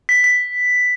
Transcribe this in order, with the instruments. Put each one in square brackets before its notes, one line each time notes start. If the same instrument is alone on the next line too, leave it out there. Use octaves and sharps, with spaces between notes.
[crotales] B6
B6